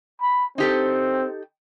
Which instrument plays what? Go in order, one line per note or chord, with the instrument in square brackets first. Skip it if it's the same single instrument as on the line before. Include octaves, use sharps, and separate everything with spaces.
[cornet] B5
[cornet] C4 [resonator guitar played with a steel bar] D#4 G4 A4